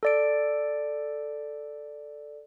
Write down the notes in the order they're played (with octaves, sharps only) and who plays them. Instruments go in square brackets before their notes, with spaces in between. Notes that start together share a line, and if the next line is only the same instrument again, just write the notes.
[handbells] A4 D5 D7